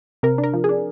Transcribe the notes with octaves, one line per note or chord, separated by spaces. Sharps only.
C3 A#4
D4
A#4
F3
D4 G#4